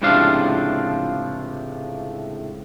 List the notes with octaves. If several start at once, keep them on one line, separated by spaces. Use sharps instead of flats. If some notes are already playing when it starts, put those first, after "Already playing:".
C#2 A2 C3 F3 D4 F5